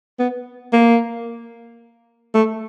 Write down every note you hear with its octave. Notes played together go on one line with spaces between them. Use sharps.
B3
A#3
A3